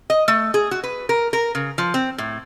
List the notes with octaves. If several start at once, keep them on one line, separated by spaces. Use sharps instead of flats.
D#5
A3
G#4
F#4
B4
A#4
A#4
C#3
F3
C4
A2